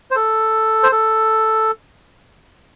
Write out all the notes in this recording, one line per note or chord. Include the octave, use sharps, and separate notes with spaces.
C5
A4
C5
A4